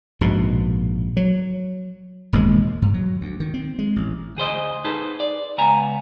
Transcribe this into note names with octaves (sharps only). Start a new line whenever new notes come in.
A#1 G#2 B2
F#3
E1 D#2 G#2 G#3
G2
F#3
D2
D#3
C4
G#3
A1
D2 G#4 C5 D#5
D#4 G#4 A4 B4 C5
D5
C#2 B3 G#5 A#5